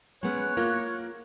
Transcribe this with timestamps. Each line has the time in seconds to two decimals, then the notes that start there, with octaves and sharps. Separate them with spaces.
0.23 G#3 B3 C#4 C#5 F#6
0.57 A#3 F4 A#4